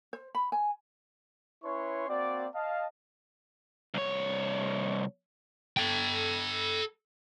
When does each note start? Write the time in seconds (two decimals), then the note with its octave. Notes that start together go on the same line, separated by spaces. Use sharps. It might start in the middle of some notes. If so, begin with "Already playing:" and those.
0.13 C5
0.35 B5
0.52 G#5
1.64 C#4 E4 B4 C#5 C6 C#6
2.09 A#3 C4 F#4 D5
2.56 D#5 F5 A5
3.94 C2 C#5
5.77 A4 G5